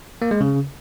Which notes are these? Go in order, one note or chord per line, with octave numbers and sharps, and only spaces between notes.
A#3
G#3
C#3